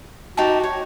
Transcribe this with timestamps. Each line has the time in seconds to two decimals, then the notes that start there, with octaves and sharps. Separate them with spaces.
0.37 D#4 F#4 G4 A5
0.64 C#5